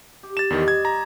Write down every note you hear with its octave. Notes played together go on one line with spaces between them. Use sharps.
G4
A6 E7
E2 D#3 G3 G4 D#5
G#6
A#5